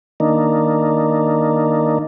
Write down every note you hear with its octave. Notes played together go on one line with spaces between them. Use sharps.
D#3 A#3 D4 D#4